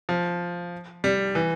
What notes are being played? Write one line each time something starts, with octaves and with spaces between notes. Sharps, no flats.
F3
G3
E3